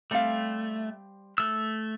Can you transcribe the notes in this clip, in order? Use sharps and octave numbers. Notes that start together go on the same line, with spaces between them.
G3 A3 C4 F5
A3 E6